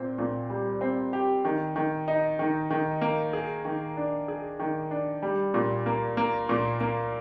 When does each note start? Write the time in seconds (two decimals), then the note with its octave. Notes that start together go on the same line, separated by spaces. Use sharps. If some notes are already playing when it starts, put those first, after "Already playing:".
Already playing: A#2 C4
0.18 A#2
0.50 G3
0.81 C4
1.13 G4
1.45 D#3
1.76 D#3
2.08 D#4
2.39 D#3
2.70 D#3
3.01 A#3
3.33 G#4
3.65 D#3
3.97 D4
4.28 G#4
4.60 D#3
4.91 D4
5.22 G3
5.54 A#2
5.86 A#3
6.17 A#3
6.49 A#2
6.80 A#3